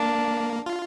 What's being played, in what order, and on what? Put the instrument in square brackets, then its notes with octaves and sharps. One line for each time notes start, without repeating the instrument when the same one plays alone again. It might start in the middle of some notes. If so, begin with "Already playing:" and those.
Already playing: [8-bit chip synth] A#3 [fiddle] D4
[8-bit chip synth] F4